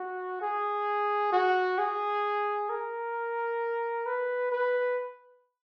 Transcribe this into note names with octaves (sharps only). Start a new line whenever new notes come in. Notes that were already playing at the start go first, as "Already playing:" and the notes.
Already playing: F#4
G#4
F#4
G#4
A#4
B4
B4